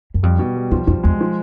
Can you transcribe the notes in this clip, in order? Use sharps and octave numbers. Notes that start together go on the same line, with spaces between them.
F#2
F2 G3
B2
G3
E2 F3
F2 F3
E2 G#3
F3